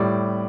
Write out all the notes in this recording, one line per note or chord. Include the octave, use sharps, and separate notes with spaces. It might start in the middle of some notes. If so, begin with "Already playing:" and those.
Already playing: A2 G3 D5